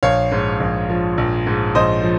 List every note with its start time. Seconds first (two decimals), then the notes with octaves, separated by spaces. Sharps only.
0.03 A#1 C#5 F5
0.32 G#2
0.60 A#1
0.89 F3
1.18 A#1
1.47 G#2
1.75 A#1 C5 D#5
2.03 F3